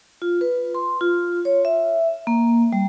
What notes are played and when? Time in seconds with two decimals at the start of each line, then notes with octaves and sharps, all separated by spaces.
0.22 F4
0.41 B4
0.75 C6
1.01 F4
1.45 C#5
1.65 E5
2.27 A#3
2.73 G3